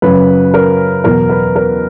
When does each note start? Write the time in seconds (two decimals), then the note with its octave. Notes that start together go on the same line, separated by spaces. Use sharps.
0.02 F#2 C#3 F#3 B4
0.54 A#4
1.04 E2 B2 F#3 A#4
1.29 B4
1.55 A#4